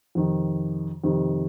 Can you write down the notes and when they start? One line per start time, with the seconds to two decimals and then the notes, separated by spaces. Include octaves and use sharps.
0.15 F2 C3 D#3
1.04 F2 C3 D#3